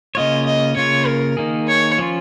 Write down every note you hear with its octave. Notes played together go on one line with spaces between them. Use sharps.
C#3 A#3 F4 C#5 D#5
D#5
C#3 A#3 F4 C#5
A#4
D#3 A#3 D#4 G#4
C#5
F3 C#4 F4